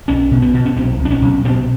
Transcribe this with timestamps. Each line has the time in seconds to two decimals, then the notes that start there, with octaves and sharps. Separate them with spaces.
0.08 B1 C#4
0.31 B2
0.42 B3
0.54 B2
0.65 C#4
0.76 B1 C4
0.99 B1
1.05 D4
1.10 C#4
1.22 B1
1.45 B2 C4